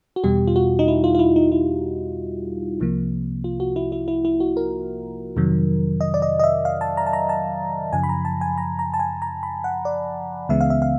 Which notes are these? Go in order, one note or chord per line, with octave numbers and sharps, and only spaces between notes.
F#4
E2 B2 G3 G4
F4
F#4
D#4
E4
F4
F4
E4
D#4
E4
C2 C3 F3 A#3
F4
F#4
E4
E4
E4
E4
F#4
A#4
F2 C3 D#3 F#3
D#5
D5
D#5
D#5
E5
F5
A5
A#5
A5
A#5
A5
F#2 C#3 F3 G#5
B5
A#5
A5
G#5
A#5
A#5
A5
G#5
A#5
B5
F#5
D5
C#2 C#3 E3 G#3 B3 E5
F5
E5
F5